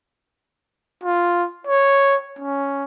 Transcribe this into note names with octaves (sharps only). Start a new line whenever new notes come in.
F4
C#5
C#4